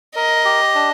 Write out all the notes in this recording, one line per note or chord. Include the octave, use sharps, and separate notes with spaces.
A#4 D#5
G4
D4